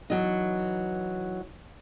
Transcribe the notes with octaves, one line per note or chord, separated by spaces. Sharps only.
E3 F#3 D#4